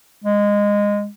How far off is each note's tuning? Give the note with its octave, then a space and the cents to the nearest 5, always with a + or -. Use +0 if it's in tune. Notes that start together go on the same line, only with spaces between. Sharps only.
G#3 -15